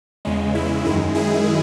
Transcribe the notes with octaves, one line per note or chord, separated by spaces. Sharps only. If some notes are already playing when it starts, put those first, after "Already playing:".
E2 C#3 G#3
E4
F#2 D#3 G#3 E4
E4 G#4